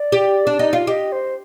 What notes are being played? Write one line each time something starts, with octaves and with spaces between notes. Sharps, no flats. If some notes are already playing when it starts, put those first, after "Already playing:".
Already playing: D5
G4
D4
D#4
F4
G4 D#5
C5